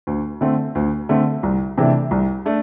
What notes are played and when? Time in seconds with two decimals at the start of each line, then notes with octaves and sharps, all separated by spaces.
0.07 D2
0.41 D3 A3 C4
0.75 D2
1.09 D3 A3 C4
1.43 C2
1.78 C3 E3 A3 D4
2.11 C2
2.46 A3 D4